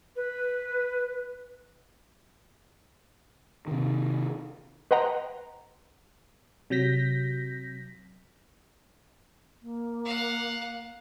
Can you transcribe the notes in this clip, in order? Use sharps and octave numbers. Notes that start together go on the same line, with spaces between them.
B4
C3 D#3
B4 C5 D#5 F#5 G5 A#5
C3 F#3 G6 A#6 B6
A#3
F5 F#5